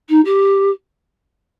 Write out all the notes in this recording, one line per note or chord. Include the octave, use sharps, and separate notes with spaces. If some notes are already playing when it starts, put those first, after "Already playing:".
D#4
G4